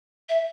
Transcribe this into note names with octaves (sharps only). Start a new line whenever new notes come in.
E5